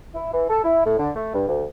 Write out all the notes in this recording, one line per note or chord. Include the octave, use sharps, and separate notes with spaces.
E4
E3
A4
E4
A2
D3
A3
G2
D2